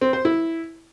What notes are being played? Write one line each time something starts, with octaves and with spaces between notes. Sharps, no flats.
C4
C5
E4